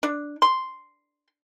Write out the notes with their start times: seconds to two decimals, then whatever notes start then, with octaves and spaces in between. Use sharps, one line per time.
0.03 D4
0.42 C6